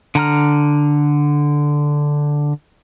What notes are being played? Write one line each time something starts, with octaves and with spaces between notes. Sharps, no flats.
D3 A#5 F6